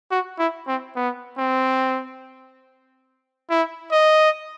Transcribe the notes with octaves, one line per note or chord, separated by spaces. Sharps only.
F#4
E4
C4
B3
C4
E4
D#5